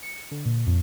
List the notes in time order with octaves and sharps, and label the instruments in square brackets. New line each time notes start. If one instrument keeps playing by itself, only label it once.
[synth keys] C#7
D3
A#2
F2